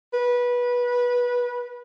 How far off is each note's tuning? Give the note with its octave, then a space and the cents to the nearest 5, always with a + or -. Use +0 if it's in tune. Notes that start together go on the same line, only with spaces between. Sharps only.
B4 -20